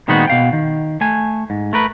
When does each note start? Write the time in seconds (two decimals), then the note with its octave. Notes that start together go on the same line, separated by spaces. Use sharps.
0.08 A#2 D#3 G#3 B3 C4 F#4
0.27 B2 F5 G5
0.53 D#3
1.01 A3 G#5
1.50 G#2
1.73 A3 A#4 B4